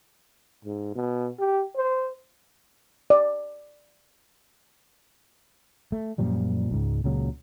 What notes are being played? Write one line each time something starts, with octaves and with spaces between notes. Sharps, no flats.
G#2
B2
G4
C5
D5
A3
F#2 A#2 F3 G3
C#2 G#2
C#2 A#2 C#3 F#3